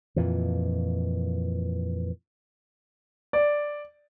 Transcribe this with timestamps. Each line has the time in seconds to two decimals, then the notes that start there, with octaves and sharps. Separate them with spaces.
0.16 F2 A#2 E3
3.33 D5